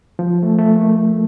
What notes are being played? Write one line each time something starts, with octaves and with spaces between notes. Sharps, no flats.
F3
A3
A3
A#3